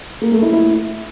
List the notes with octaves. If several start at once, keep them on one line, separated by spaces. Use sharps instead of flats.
A#3
A3
E4
E4